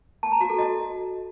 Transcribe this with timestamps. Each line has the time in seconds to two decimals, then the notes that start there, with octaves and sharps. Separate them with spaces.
0.23 A5
0.32 A#5
0.41 F#4
0.50 A4
0.58 D#5